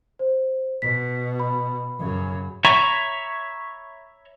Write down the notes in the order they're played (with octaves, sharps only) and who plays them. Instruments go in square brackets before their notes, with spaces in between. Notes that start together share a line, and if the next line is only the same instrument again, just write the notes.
[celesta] C5
[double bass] B2 [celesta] B6
[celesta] B5
[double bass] F#2 C#3
[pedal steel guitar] C#5 E5 A#5 B5 C#6